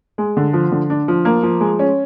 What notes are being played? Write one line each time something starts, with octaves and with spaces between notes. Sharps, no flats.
G#3
D3
F3
D3
D4
F3
A#3
F3
G#3
C#4